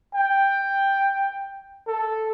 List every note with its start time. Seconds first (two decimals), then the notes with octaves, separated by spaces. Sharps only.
0.15 G5
1.87 A4